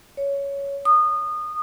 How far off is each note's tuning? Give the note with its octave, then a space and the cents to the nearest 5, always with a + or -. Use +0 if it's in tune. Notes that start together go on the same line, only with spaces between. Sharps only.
C#5 +10
D#6 -25